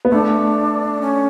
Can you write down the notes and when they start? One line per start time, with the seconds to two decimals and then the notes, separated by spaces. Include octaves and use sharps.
0.05 B3
0.12 A3 D4
1.01 C#4